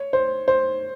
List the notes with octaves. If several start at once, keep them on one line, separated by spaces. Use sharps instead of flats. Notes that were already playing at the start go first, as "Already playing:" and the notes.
Already playing: C#5
C5
C5